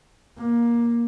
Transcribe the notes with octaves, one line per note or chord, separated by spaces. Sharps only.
A#3